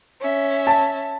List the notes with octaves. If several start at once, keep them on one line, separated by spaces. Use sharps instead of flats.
C#4 E5
A5